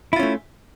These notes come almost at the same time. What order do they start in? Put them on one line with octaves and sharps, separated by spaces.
E4 F4 C#4 A3